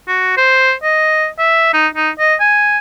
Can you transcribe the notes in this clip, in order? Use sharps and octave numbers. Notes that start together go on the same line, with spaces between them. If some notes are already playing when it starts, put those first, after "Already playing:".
F#4
C5
D#5
E5
D#4
D#4
D#5
G#5